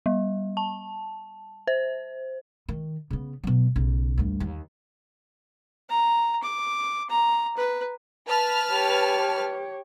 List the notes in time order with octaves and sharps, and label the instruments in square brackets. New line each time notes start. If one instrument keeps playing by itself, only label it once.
[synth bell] G3
A5
C5
[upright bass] D#3
C#3 B3
B2 F#3
B1 C#3
D2 G2
D#2
[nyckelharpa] A#5
D6
A#5
B4
[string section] B4 A5 F6
[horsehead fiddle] G4 C#5